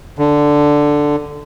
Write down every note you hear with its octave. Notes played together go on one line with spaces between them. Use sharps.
D3